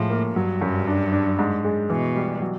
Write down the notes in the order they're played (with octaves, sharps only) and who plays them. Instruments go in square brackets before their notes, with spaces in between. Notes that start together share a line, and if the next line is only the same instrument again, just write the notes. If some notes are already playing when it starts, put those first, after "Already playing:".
Already playing: [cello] A2 [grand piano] F3 G#3
[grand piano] A#3
[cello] G2 [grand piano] F#3
[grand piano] F#2
D4
D4
G#2
G#3
[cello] B2 [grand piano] E3
[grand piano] G3
F#3